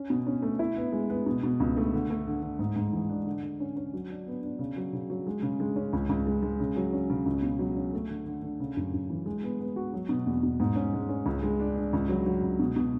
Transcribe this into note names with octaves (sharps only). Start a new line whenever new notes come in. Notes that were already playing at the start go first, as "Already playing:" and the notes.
Already playing: C#4
B2
C#4
A3
E4
B3
G#3
B3
B2
B2
C#2
A3
D3
A3
D3
D3
G#2
G#2
E3
D4
D3
D3
C#4
C#4
F#3
D4
B3
D4
C#3
F#3
C#3
F#3
G#3
C#3
G#3
C#4
C#2
C#2
G#3
G#3
C#3
F#3
C#4
C#3
C#2
B2
F#3
C#4
A3
D3
D3
D3
C#3
F#2
F#2
E3
G#3
B3
B3
F#4
F#3
B2
E2
B2
G#2
C#4
G#3
C#4
C#2
G#3
D4
D4
C#2
F#3
F#3
C#2
B2
B2